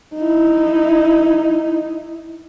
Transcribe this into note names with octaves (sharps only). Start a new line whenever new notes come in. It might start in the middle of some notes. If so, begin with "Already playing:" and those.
D#4 E4